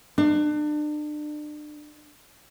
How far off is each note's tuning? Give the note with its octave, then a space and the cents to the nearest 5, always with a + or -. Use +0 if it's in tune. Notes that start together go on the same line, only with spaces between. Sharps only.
D4 +35